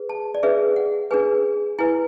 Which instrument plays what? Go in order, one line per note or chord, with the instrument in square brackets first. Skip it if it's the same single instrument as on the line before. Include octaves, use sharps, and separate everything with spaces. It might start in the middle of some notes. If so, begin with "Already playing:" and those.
Already playing: [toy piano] G#4 B4
A5
D5
D4 G#4 B4 E5
F#5
D4 G#4 B4 G#5
E4 B4 G#5